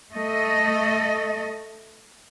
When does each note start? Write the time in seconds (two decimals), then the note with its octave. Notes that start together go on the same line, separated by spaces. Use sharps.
0.14 A3 D#5